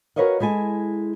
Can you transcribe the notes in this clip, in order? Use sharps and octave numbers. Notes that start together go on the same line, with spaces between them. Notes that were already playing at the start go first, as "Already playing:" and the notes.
F#4 A#4 B4 C#5 D#5 F5
G#3 E4 A4 G#5